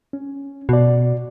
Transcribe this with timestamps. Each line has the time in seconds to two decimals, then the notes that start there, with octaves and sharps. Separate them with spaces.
0.13 C#4
0.69 B2 F#4 D5